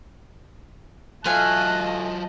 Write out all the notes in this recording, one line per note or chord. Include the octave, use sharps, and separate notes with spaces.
F#3 A3 F4 D#5 F5 G#5 A5 F#6